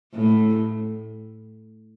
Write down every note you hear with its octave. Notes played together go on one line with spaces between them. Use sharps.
A2